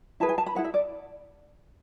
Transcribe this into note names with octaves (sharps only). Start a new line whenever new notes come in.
E4 G#4 B4 A5
G#5
A5
B5
E4 G#4 B4 F#5
E5
D5